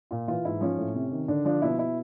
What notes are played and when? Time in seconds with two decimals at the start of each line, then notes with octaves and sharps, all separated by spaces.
0.11 A#2 F4
0.28 E3 F4
0.45 G#2 E4
0.61 F3 C#4
0.78 A2
0.94 C3
1.11 D#3
1.28 D3 D4
1.45 F3 D4
1.62 B2 E4
1.79 E4